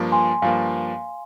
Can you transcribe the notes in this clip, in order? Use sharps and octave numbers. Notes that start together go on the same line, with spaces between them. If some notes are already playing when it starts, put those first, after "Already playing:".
Already playing: G2 F3 A#3
G#5 C6
G2 F3 A#3 F5 G#5